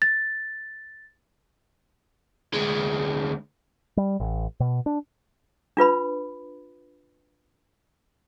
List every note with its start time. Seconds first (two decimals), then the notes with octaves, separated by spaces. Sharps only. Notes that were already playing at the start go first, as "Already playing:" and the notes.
0.02 A6
2.54 D2 G#3
3.97 G3
4.20 A1
4.60 B2
4.86 D4
5.77 D4 F4 B4 B5